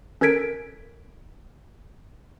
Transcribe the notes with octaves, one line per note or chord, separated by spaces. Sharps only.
C#4 A4 A#4 G#6 B6 D7